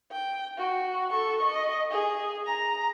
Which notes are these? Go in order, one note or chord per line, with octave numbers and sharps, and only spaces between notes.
G5
F#4
A4 C#6
D#5
G#4
A#5